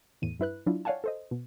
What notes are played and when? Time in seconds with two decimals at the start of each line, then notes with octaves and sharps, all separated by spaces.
0.22 E2 A2 D#7
0.39 G2 E4 B4 F#6
0.66 F#3 D4 E4 F4
0.85 C#5 D5 F5 F#5 G#5 A5
1.04 A4 C5 D#5
1.31 B2